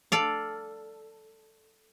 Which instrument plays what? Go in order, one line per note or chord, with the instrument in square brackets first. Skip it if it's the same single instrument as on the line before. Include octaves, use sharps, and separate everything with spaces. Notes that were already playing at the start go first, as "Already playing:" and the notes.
[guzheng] A4 D5 F5